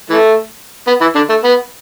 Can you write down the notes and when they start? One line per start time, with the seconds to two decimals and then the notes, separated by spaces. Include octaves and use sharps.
0.10 E3 A3
0.87 B3
1.01 E3 E4
1.15 D3 D4
1.29 A3
1.44 B3